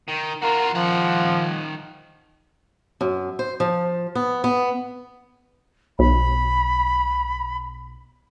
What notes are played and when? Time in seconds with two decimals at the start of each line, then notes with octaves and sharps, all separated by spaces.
0.09 D#3
0.42 F4 F#4 A#4
0.75 D#3 F3 F#5
3.01 F#2
3.39 C5
3.60 F3
4.15 B3
4.44 B3
5.99 B1 B5